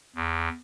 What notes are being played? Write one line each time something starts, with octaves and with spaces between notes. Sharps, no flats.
E2